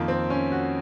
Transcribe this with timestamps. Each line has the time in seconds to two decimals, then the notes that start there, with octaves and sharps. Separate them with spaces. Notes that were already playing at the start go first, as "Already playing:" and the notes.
Already playing: F2 D#3 A#3
0.08 C4
0.30 C#4
0.52 F#4